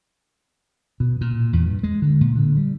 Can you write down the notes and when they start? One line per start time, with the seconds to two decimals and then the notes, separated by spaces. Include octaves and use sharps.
1.00 B2
1.21 A#2
1.53 E2
1.65 G2
1.83 G#3
2.02 D3
2.21 A#2
2.36 D3
2.57 G3